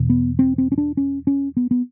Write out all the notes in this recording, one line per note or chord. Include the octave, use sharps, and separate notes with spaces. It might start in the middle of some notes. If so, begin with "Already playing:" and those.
Already playing: E2 B2
B3
C4
C4
C#4
D4
C#4
C#4
B3
B3